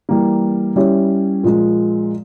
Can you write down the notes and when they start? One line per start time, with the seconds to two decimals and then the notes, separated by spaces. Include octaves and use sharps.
0.09 E3 G3 A#3
0.76 G3 C#4 E4 G4 C#5
1.44 A#2 F3 G#3